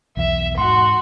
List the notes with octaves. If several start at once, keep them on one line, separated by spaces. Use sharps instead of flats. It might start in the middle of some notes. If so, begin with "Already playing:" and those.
B1 E2 E3 E5
G#2 F#4 C6